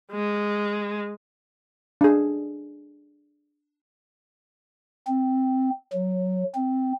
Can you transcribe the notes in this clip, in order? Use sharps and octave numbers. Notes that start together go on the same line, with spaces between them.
G#3
D4 G#4
C4
F#3
C4